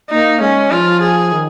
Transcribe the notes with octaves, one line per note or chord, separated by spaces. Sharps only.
A#3 D#4
G#3 C#4
F3 F4
G#4
D#3